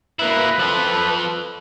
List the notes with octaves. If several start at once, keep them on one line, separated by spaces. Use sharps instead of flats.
A#3 E4 B4
F3 A4